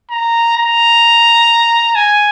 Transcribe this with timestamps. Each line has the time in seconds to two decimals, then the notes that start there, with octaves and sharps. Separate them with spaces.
0.11 A#5
0.57 A#5
1.95 G#5